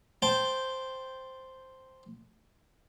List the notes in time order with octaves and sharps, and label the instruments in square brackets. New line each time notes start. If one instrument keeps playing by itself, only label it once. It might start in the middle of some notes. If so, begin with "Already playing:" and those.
[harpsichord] C5 G5 A5